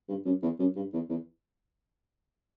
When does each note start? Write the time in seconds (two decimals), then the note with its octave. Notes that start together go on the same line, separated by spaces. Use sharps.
0.08 G2
0.25 F#2
0.42 E2
0.59 F#2
0.76 G2
0.93 E2
1.09 E2